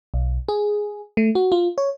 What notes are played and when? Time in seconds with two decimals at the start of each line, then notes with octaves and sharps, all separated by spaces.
0.14 B1
0.49 G#4
1.17 A3
1.35 F#4
1.52 F4
1.78 C#5